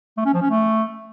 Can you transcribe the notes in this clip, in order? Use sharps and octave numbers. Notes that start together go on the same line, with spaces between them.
A3
C#4
F3
C#4
A3